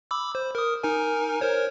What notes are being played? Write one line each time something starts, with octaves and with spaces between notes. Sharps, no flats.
B5 D6 E6
C5
A#4 D#6
D#4 A#4 G#5
A#4 C5 C#5